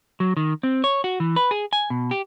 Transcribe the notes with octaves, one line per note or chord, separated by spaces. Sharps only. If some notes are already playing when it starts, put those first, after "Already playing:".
F#3
D#3
C4
C#5
F#4
E3
B4
G#4
G#5
B2
G4